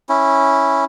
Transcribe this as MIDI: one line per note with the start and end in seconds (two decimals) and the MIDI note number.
0.09 0.84 61
0.09 0.84 64